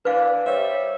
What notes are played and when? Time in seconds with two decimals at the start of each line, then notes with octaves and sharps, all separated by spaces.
0.05 E3 D4 B4 F5
0.46 G3 C5 C#5 E5